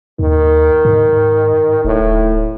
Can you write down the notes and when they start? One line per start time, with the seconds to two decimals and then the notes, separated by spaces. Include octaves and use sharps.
0.19 D#2 D#3
0.85 G#2
1.85 D1 A2